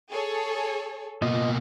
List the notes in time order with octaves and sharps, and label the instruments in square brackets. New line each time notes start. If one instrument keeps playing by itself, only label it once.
[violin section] G#4 A4 C#5
[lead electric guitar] B2 A#3 [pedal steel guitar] F4 D#5 D#6